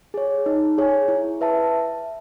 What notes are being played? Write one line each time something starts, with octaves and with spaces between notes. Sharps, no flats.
G#4 C#5
D#4
G#4 C#5 G#5
E4
B4 E5 A5